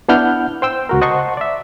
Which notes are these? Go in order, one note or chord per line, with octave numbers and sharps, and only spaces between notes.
B3 D4 E4 F#5 F6 G6
C5 G5 E6
C#2 F#4 A#4
C5 D#5 F#5 A5 C6 C#6
D5 E5